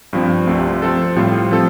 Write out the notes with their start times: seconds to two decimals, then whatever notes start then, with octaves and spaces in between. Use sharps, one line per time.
0.13 G2 F3 C4
0.47 C2 C3 A3 F4
0.82 F3 C4 A4
1.16 A2 G3 C4 F4
1.51 F3 C4 A4